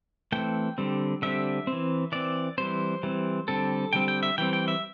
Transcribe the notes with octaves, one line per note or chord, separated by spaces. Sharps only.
E3 A3 C4 G5
D3 G3 C4
D3 G3 C4 E5
C4
E3
E3 C4 D5
E3 G3 C4 C5
E3 G3 C4
D3 G3 C4 A4
D3 G3 C4 G5
G5
E5
E3 G3 C4 G5
G5
E5